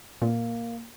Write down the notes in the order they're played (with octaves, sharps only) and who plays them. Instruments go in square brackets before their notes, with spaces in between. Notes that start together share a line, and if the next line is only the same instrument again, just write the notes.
[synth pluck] A#2 [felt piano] A#3